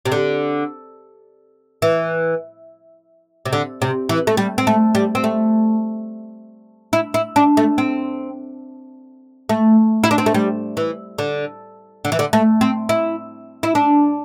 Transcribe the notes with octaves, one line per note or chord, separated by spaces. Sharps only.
C3
D3
E3
C3
D3
C3
E3
A3
G3
C4
A3
G3
C4
A3
E4
E4
D4
A3
C4
A3
E4
D4
C4
A3
G3
E3
D3
D3
E3
D3
A3
C4
E4
E4
D4